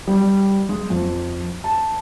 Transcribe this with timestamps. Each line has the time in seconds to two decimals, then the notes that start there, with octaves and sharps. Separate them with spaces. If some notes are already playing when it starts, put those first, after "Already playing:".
0.07 G3
0.69 G#3
0.90 F2
1.64 A5